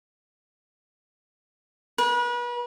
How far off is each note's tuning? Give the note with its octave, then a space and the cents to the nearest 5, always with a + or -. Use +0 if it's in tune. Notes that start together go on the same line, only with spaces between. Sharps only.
B4 -35